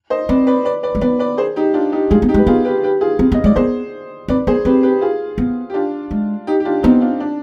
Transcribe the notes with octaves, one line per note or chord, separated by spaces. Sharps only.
C5 D#5
C4 B4 D5
B4 D5
B4 D5
B4 D5
G#3
B3 B4 D5
B4 D5
G#4 C5
D#4 G4
D4 F4
D#4 G4
G#3 F4 G#4
B3
D#4 G4
G#3
B4
B3 F4 G#4
G4 B4
G4 B4
F4 G#4
C4
B3
D#5
G#3 D5
B3 G#4 C5
C4 B4 D5
B3 G#4 C5
C4 G4 B4
G4 B4
F4 G#4
B3
G4
D4 F4
G#3
D#4 G4
G4
D4 F4
B3 C4 D#4
D4 F4
D4